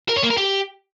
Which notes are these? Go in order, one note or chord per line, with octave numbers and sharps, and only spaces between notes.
A#4
C#5
A#3
A#4
G4